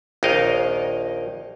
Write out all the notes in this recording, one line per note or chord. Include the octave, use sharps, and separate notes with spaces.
A#1 D#2 D#4 A#4 D#5 F5